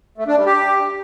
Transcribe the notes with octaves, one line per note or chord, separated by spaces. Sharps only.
A3
D4
G3
G4